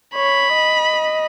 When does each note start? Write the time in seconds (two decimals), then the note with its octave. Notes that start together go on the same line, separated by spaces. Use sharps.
0.15 C#5 B5
0.54 D#5